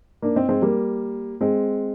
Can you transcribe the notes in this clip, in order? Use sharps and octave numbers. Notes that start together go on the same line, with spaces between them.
A#3 D4
C4 D#4
G#3 C4
G3 A#3
G#3 C4